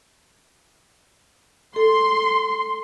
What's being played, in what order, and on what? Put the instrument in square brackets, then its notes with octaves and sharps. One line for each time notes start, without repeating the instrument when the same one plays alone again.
[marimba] A4 [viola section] C6